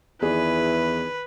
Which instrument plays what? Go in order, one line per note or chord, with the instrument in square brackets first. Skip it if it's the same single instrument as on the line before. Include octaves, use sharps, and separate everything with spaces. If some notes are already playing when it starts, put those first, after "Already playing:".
[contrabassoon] E2 [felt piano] D#3 G#4 D5 [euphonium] E4 [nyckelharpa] B4